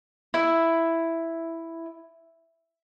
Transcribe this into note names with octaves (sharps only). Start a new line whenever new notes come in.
E4